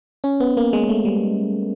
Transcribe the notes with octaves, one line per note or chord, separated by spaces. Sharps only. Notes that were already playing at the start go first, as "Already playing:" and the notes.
C#4
B3
A#3
G#3
A3
G3